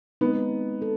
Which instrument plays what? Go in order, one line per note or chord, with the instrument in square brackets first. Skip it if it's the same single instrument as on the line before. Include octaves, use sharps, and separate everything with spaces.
[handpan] G#3 C4 D#4 [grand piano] B3
[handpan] A4